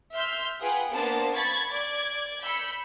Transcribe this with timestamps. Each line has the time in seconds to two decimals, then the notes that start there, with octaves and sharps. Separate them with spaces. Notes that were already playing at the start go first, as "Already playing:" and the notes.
0.15 E5 C6 F6 G6
0.60 F4 G#4 B4 F#5 G5
0.91 A#3 B3 D4 C5 A5
1.34 B5 C#6 G#6 A6
1.71 D5 G#6
2.43 B5 E6 G6 C#7